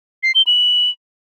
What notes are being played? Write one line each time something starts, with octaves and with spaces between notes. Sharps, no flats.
C7
G7
F#7